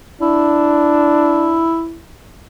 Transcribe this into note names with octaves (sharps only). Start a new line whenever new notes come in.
D4 E4